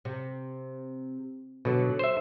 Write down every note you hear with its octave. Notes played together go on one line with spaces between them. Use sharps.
C3
B2 D3 F#3
C5 E5